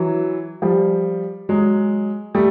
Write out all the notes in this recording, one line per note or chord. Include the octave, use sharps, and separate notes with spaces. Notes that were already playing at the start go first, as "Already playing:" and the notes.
Already playing: E3 F#3
F3 G3
F#3 G#3
G3 A3